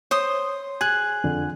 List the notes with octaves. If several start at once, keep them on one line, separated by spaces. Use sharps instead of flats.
C5 C#5 C6 D#6
G#4 G#5 F#6
F2 D3